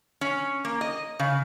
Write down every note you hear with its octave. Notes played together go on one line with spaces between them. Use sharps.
C#4
A#3
D#5
C#3